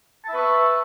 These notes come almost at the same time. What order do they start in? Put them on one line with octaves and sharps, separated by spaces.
A5 E5 B4 C#6